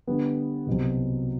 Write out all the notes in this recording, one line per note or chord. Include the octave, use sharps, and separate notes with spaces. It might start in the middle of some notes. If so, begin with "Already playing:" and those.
D3 G3 B3
C2 B2 F#3 C4